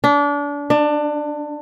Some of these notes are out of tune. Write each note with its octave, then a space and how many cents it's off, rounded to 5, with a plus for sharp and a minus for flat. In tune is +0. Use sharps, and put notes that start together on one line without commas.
D4 -30
D4 +20